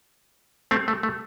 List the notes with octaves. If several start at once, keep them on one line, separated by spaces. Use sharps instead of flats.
A3 C4
A3
A3